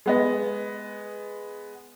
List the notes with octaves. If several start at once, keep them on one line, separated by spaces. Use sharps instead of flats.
G#3 B3 D#5